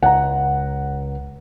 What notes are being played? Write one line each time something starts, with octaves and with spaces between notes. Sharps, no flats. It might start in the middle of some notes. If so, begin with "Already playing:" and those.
C#2 F#5 A#5